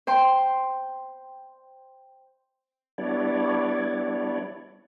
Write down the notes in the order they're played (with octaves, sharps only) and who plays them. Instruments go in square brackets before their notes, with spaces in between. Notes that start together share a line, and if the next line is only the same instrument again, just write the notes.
[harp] C5 G5 C6
[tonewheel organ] G3 B3 D4 E4 C#5 D5